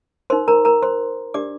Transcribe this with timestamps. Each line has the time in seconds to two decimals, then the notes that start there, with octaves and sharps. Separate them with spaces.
0.30 D#4 A#4 C5 C6
0.48 A#4 A#5
0.65 A#4 A#5
0.83 C5 C6
1.34 D4 G4 A#4 D5 D6